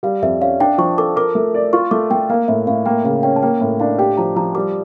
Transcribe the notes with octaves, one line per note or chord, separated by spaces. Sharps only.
G3 F5
F2 E5
C#4 F5
D4 G5
F3 C#6
A4 D6
A#4 D6
A3
D5
F4 C#6
A3 D6
A3 G5
A#3 F5
A2 E5
A2 F5
A#3 G5
C#3 F5
C#4 G5
A5
A#3 G5
A2
D4 F5
G4 G5
F3 A#5
F3 A#5
G3 D6